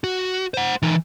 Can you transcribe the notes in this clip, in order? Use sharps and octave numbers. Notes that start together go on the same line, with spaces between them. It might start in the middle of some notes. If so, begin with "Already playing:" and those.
F#4
C5 F#5
E3 D#4